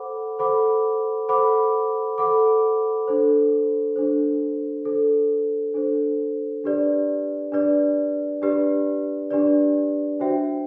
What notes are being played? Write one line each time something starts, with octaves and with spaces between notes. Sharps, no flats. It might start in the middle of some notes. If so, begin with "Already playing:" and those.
Already playing: A4 C5 F#5 B5 D6
A4 C5 F#5 B5 D6
A4 C5 F#5 B5 D6
A4 C5 F#5 B5 D6
D4 A4 C5
D4 A4 C5
D4 A4 C5
D4 A4 C5
D4 G4 B4 D5
D4 G4 B4 D5
D4 G4 B4 D5
D4 G4 B4 D5
D4 F#4 C5 E5 G5